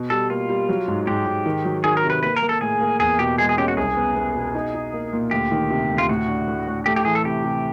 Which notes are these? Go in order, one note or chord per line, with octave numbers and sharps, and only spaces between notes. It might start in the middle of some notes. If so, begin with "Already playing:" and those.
Already playing: B2
G3 A4
A#3 F4
G3
F#3
G#2
G#2 G4
G#2
D#3
F#3
D#3 G#4
A#4
C3
B4
A#3 B4
A#4
A#3
A4
A2 G#4
A#3
E2 G#4
B2 G4
G#3 G#4
G#4
C#4 G4
F#4
C2 G#4
B3
B3
B2
D#4
D#4
A#3
A#2
D2 G4
D#3
C3
D2
F4
A2 F#4
D4
A2
A2
A3 G4
G4
E3 G#4
A4
C3 G4
C3